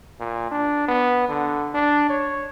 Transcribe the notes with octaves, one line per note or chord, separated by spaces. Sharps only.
A#2
D4
B3
D3
D4
C#5